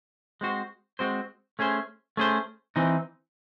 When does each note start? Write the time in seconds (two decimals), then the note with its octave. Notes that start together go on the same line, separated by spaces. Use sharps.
0.41 G#3 C4 F#4 C5
0.99 G#3 C4 F#4 C5
1.59 A3 C#4 G#4 C5
2.17 A3 C#4 G#4 C5
2.76 E3 C4 D#4